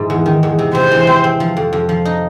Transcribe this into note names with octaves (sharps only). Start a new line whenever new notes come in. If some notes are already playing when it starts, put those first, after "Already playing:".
Already playing: G#2 E3
E2
D#3
E2
C3
C3 C5
E3
C4
C4
F3
F2
F2
F3
D#4